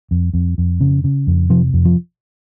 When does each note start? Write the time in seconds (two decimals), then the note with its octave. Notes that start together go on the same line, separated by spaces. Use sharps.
0.11 F2
0.34 F2
0.58 F2
0.81 C#3
1.04 C#3
1.27 F2
1.50 C3 F3
1.73 F2
1.85 F3